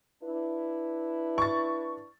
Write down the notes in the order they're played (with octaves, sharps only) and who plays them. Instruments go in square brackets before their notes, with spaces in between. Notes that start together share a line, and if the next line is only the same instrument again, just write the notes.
[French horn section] D4 E4 B4
[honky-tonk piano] C#6 A6